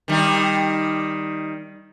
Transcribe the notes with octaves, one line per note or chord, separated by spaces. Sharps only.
D#3 G3 D#4